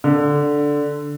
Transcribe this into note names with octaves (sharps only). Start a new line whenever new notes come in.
D3